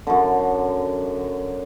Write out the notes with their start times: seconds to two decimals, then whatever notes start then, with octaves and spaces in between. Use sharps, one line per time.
0.07 F#2 D3